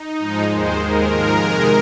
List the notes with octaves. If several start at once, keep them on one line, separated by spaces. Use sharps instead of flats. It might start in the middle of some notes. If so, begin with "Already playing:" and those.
Already playing: D#4
G#2 F3 G#3
D#2 D#3 G#3 C5
D#2 D#3 G#3 A#4
G#2 F3 G#3
F2 C3 D#3 G#3